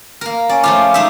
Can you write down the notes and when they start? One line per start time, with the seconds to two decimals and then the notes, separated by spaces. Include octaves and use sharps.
0.21 A#3 A#4
0.49 C#4 D5
0.64 F3 A3 F4 D6
0.94 G#3 D#4 E5